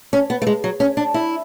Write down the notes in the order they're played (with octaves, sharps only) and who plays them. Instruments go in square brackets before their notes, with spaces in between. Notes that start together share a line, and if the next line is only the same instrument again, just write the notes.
[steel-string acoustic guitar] C#4
B3
A3
G#3
F#3
C#4
D4
E4